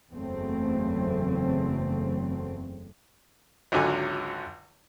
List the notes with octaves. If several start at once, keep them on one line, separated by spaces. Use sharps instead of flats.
F#1 E2 C#3 F#3 A3 C4
G#1 C#2 D3 F#3 G#5